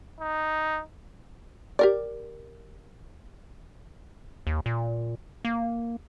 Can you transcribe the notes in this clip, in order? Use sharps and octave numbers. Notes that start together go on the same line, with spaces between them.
D#4
G4 A#4 D5
D#2
A#2
A#3